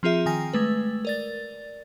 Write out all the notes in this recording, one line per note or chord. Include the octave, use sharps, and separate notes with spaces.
F3 C4 F4 G#4 E5
D#3 G5 G#5 A#6
G#3 A3 B4
A#4 D5 A6